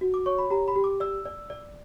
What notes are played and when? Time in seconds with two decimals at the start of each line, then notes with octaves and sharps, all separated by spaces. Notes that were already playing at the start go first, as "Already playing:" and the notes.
0.01 F#4
0.14 D6
0.26 C#5 C#6
0.38 B5
0.50 G4 A#5
0.68 B5
0.76 G4
0.84 D6
1.00 D5 E6
1.25 D5
1.50 D5